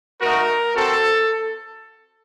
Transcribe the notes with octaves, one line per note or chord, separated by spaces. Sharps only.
A3 D#4 F#4 A#4
C4 F#4 A4